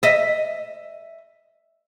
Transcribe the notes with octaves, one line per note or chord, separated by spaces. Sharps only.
D#5 E5